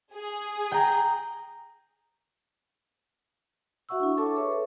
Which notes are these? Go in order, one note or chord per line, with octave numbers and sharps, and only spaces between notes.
G#4
G5 A#5
F#4 E5 F#5 C#6 E6
D4 E4
A4 C#5 E5 A5 C#6 D6
G#4 B4 C#5 E5
A4